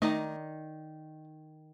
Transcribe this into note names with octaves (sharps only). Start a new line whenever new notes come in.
D#3 A3 D#4 D5 D#5